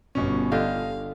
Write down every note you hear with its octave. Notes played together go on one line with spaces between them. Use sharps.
G1 B2 C#4
D3 F4 G4 D#5 F5